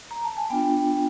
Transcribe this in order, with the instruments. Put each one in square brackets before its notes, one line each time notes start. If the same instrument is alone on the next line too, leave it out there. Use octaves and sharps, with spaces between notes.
[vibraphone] A#5
A5
G#5
B3 D4 F4 G5